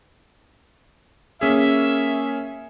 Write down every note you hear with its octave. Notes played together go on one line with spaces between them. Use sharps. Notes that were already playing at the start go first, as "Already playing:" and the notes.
A#3 C#4 G#4 E5